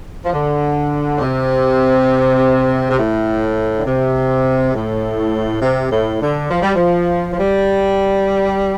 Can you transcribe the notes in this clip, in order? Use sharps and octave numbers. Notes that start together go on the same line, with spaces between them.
F3
D3
A2
C3
C3
A2
D3
C3
A2
C3
A2
D3
F3
G3
F3
F3
G3